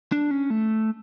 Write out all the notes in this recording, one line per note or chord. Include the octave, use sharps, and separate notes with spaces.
D4
C#4
A3